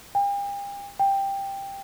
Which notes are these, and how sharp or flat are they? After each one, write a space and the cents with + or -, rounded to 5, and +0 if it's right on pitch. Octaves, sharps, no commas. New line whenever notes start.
G5 +45
G5 +10